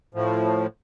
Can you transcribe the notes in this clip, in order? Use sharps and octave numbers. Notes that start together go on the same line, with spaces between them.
A2 F3